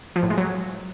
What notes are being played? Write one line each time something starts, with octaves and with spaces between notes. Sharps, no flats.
F3
A2
G#3
F#3